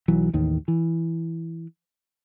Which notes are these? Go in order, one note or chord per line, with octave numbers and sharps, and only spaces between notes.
B1 E3 F#3
A1 D#2 D#3
E3